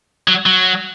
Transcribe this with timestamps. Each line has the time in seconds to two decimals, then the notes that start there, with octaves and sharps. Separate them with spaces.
0.28 F#3
0.46 F#3